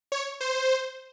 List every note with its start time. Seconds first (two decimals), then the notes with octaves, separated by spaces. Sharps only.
0.12 C#5
0.41 C5